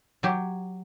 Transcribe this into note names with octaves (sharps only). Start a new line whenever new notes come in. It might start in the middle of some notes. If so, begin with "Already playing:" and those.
F#3 G4